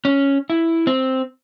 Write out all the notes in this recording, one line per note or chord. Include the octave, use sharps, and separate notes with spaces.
C#4
E4
C4